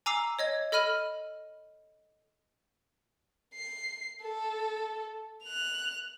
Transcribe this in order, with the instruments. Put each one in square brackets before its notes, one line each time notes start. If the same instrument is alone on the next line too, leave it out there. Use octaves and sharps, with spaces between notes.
[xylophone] G#5 A#5 D6 E6 C7
C#5 D#5 G#6
A4 D#5 B5 F6 D#7 F#7
[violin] C7
A4
F#6 F7